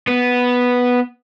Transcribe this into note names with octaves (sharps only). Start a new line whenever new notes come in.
B3